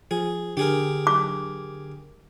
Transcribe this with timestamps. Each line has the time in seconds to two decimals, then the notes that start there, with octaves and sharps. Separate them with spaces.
0.11 F3 G#4
0.57 D3 G4 G#4 A#4
1.07 D6